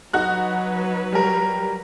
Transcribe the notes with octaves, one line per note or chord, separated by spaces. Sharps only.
F#3 D#4 F#4 B4 F#6
G3 A#4